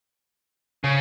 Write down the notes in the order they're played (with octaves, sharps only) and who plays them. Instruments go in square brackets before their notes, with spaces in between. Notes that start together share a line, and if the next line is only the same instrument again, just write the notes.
[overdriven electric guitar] C#3